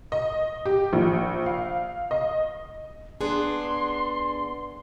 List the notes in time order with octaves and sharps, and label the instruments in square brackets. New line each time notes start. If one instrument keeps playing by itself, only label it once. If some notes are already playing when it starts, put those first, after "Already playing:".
[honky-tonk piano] D#5
G4
A#1
F5
D#5
[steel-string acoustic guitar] B3 D4 G#4 [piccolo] C6